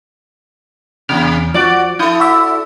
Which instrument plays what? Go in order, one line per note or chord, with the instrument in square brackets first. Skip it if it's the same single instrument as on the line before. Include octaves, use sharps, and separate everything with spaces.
[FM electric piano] E2 F6 [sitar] C3
[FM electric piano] F3 D6 [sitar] F#4 D5
[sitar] E4 A4 [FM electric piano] D#6 G6 G#6
[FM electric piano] F#4 D5 E5